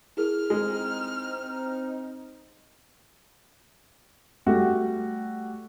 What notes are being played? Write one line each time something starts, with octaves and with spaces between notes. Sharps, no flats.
E4 G#4 A#4 F6
G#3 C4 D#4
G3 A3 F#4 G4